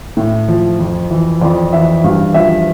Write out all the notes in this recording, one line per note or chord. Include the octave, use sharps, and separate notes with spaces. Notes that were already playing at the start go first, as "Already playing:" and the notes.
A2
F3
F2
E3
F2 D5
E3 E5
G2 F5
F3 E5